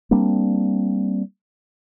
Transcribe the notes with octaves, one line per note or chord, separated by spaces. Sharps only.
G3 A#3 C4 D4